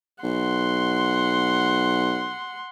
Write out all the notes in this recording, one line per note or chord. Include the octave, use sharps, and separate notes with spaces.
B1 F#5 C6